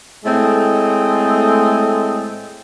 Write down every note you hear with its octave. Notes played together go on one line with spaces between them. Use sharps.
A2 G#3 A3 C4 D#5